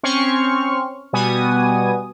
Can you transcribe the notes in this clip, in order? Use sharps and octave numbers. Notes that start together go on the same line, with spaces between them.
C4 C#4 C6 C#6 F6
B2 G3 B3 F#4 G#5 D#6